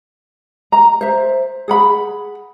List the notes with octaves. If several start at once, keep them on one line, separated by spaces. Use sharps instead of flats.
A#5
C5 E5
G#4 F#5 B5